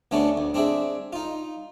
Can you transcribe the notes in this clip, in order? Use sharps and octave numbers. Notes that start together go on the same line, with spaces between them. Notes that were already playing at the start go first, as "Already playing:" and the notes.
D2 A3 B3 C#4 D4
D2
C4 D4 G#4 E5
D#4 F4